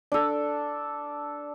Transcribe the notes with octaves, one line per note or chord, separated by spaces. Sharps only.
D4 A4